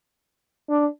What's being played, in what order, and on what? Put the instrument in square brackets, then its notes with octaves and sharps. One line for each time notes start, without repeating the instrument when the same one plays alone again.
[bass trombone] D4